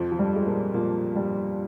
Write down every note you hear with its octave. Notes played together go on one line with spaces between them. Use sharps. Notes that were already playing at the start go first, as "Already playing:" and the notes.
Already playing: F2 F3
F3
G2 G3
G#3
A#2 A#3
A#2 A#3
G2 G3